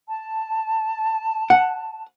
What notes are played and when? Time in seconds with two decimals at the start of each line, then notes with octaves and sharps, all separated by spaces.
0.07 A5
1.50 F#5